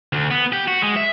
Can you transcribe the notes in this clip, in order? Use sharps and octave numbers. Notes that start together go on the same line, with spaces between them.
D2
B3
G4
F#4
G#3
E5